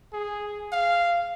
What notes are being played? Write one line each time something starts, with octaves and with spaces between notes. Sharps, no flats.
G#4
F5